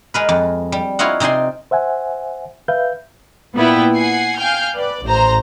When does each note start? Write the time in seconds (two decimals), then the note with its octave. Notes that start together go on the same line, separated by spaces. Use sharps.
0.14 G#3 A#4 B4
0.29 F2
0.72 G3
0.99 E4 F4 A#4 C#5 D#5 F#5
1.20 C3 D#4 D5 G#5 C6
1.71 C5 E5 F#5 G#5
2.68 B4 E5 F5 G6
3.54 A#2 B3 E4 B4 G5
3.94 F#5 G#5 C7
4.38 F5 G5 G#5 F6 G6
4.76 B4 D5
5.05 A1 C5 A#5